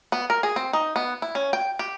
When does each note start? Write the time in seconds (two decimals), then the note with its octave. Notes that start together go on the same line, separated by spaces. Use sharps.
0.12 B3
0.30 A#4
0.43 G#4
0.56 C4
0.73 D#4
0.96 B3
1.22 E4
1.35 C#4
1.53 G5
1.79 G4